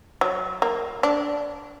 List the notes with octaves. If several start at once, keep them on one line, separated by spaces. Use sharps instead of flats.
F#3
A#3
D4